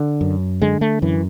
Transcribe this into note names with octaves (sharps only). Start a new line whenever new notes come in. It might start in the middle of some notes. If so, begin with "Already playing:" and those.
Already playing: D3
F#2
D3 G#3
A3
F#2 E3